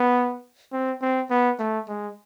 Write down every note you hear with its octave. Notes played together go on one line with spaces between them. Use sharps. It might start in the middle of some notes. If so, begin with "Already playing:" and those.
Already playing: B3
C4
C4
B3
A3
G#3